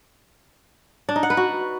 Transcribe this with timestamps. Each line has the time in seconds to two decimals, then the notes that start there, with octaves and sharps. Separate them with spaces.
1.09 D4
1.16 D#4
1.23 F#5
1.30 B4
1.37 F#4